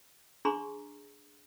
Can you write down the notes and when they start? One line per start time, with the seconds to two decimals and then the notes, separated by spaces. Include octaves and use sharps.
0.45 D4 G#4 A#5 C6 C#6